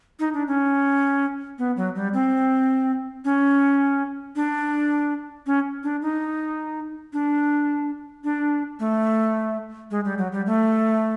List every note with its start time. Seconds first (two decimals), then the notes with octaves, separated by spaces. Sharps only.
0.20 D#4
0.34 D4
0.47 C#4
1.59 B3
1.77 F#3
1.95 G3
2.14 C4
3.25 C#4
4.36 D4
5.46 C#4
5.84 D4
6.02 D#4
7.13 D4
8.24 D4
8.80 A3
9.91 G#3
10.05 G3
10.18 F#3
10.32 G3
10.46 A3